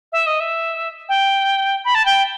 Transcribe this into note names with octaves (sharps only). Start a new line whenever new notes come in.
E5
D#5
E5
G5
B5
A5
G5